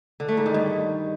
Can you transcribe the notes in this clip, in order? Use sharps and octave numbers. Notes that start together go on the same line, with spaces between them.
D3
A3
G#2
D#3
G2